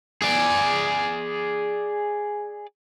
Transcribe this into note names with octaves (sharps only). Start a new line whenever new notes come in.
G#4 D5